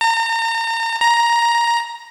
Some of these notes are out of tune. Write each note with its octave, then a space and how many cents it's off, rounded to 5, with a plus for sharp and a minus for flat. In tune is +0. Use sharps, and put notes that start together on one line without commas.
A#5 -35
A#5 +10